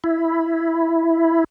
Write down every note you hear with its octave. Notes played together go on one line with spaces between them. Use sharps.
E4